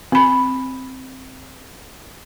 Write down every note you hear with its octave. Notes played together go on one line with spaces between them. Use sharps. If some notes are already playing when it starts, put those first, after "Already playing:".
C4 B5